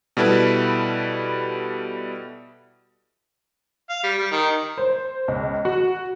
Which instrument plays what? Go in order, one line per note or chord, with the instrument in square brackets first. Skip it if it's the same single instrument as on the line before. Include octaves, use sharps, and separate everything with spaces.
[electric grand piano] B2 G3 E4 A4 B4
[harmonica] F5
G3
G3
D#3
[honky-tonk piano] C5
C#2
F#4